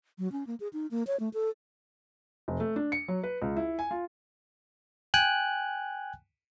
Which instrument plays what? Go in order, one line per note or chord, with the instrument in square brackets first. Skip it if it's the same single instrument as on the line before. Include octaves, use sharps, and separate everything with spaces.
[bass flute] F#3
C#4
A#3
G#4
D#4
A#3
C#5
A3
A4
[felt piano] F1
A3
D4
C#7
F#3
B4
C#2
E4
G#5
F4
[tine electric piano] G5 G#5 F#6